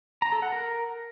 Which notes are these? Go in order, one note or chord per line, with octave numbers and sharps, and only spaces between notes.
A#5
A4
F#5
A#4